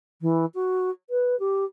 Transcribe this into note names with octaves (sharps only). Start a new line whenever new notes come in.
E3
F#4
B4
G4